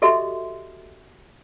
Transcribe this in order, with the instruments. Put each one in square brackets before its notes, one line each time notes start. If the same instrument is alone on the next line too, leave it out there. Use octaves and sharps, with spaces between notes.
[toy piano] F#4 G4 A4 D#5 E5 C6